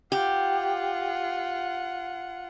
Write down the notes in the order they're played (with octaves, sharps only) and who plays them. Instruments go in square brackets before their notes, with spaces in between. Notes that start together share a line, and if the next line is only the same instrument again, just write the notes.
[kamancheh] F4 F#5 [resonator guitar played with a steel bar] G4